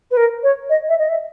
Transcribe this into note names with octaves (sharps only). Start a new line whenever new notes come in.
B4
A#4
C#5
D#5
E5
D#5
E5